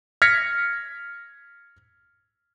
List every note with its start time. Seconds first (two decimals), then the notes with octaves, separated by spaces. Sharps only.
0.22 F6 G#6 A#6 B6 C#7